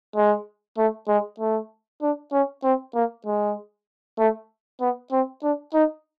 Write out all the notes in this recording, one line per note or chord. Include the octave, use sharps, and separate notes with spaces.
G#3
A3
G#3
A3
D4
C#4
C4
A#3
G#3
A3
B3
C4
D4
D#4